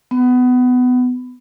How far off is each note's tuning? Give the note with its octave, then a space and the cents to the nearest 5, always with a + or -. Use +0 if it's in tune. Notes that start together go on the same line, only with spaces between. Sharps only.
B3 +20